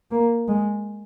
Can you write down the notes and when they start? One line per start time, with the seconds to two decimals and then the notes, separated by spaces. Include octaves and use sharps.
0.11 A#3
0.48 G#3